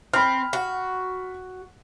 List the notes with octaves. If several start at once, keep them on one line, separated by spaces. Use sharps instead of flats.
C4 B5 F6
F#4